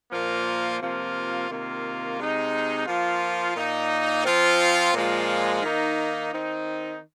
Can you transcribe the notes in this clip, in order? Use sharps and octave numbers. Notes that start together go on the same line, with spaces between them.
A#2 F3 A#3 F4
C3 F3 A#3 F4
C3 D#3 A#3 F4
C3 G#3 D#4
F3 A#3 F4
A#2 A#3 D#4
F3 C4 F4
A#2 F3 G#3 F4
D#3 A#3 D#4
D#3 C4 D#4